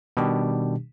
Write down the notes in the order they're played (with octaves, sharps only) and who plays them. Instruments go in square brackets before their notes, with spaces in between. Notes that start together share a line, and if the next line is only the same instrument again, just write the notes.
[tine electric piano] B2 D#3 G3 D4 G4